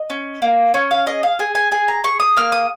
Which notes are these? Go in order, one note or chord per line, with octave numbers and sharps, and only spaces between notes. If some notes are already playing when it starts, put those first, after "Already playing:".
Already playing: D#5
C#4
A#3
C#4 C#5
F5
G#4 D#5
F5
G#4 G#5
G#5
G#4 G#5
A#5
G#4 C#6
D#6
A#3 F6
D#6